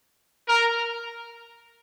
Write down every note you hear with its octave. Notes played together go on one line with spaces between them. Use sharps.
A#4